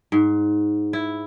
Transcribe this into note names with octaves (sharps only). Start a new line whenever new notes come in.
G#2
E4